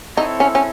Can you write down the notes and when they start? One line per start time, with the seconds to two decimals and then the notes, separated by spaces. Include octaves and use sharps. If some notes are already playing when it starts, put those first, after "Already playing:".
0.17 C4 D#4 E4 A4 C#5
0.40 C#4
0.55 C#4